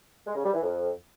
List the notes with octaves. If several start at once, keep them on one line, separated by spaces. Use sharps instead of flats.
G#3
C#3
G3
E3
F2